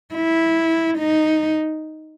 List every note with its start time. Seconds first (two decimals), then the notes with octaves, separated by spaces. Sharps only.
0.14 E4
0.98 D#4